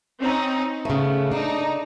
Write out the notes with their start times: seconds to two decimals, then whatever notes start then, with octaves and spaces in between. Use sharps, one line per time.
0.20 C4 C#4 D#4
0.85 C#3 A3 B3
1.32 D4 D#4